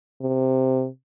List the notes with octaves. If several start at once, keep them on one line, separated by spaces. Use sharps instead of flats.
C3